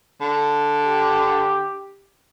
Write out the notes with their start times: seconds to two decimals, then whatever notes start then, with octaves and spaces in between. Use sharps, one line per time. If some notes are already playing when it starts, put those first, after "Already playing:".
0.21 D3
0.85 G4